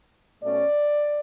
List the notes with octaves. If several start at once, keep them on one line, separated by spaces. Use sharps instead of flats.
B2 A3 C#4 D5